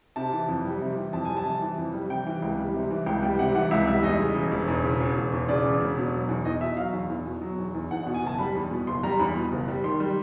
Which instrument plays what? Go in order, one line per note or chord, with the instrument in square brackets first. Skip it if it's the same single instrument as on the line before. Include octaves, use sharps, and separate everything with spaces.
[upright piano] C3 A5
E3
F2
G3
C3
E3
F2 A5
G3 G#5
A5
C3
E3
F2
G3
C3 G5
E3
C#2
G3
C3
E3
C#2 G5
G3 G5
C3 F#5
E3 F#5
C#2 E5
G3 E5
E2 D#5
C#3
E1
E1
E2
C#3
E1
E1
E2
C#3 D5
E1
E1
B2
F#3
E2
E2 D#5
B2 E5
F#3 F5
E2
E2
B2
F#3
E2
E2
E2 F#5
F#5
B2
G#5
F#1 A5
G3 B5
E2
B2
F#1 C6
G3 A#5
E2 B5
B2
F#1
G3
D#3 C6
G3